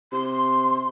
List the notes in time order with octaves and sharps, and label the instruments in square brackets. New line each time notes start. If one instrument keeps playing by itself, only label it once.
[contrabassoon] C3 [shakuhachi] C6